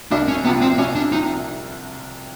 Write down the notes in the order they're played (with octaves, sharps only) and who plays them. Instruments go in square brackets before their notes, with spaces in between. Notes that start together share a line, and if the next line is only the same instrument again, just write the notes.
[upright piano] C2 [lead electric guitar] D4
[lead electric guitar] C#4
[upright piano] C3 F3 [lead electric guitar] B3
[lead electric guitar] C4
[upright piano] C2 [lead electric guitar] C#4
[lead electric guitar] D4
[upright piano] C3 F3 [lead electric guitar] D#4